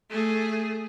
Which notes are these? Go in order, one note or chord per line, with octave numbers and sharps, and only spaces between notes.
A3 G#4